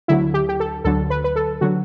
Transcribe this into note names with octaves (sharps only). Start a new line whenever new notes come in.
D2 D3 F#3 E4
G4
G4
A4
D2 D3 F#3 A4
B4
B4
A4
D3 F#3 F#4